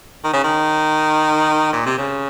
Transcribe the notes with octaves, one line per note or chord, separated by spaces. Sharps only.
D#3
C#3
D#3
A#2
C3
C#3